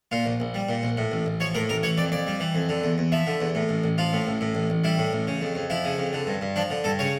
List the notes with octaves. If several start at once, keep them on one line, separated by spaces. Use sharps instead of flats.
A#2 F4
A#1
A#1
G3
A#2
A#1
A2
A1
A1
F3 C#5
A2 A#4
A1 A#4
E3 C#5
F2 D5
F2 D5
G3
E3
F2
D3
E2
E2
F3 E5
D3
E2
A2
A1
A1
F3 F4
A2
A1
A2
A1
A1
G3 E4
A2
A1
C#3
F2
F2
F3 E4
C#3
F2
D3
G2
G2
F3 D4
D3
G2 A4
C#3 C#5